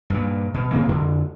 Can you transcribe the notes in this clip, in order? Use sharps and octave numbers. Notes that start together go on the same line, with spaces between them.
G2 A#2
B2
C3 E3 A#3 C4
F2 D3